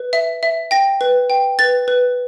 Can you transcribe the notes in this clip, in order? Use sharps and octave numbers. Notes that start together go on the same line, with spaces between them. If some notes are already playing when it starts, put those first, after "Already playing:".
Already playing: B4
E5
E5
G5 A#6
B4
G5
B4 A6
B4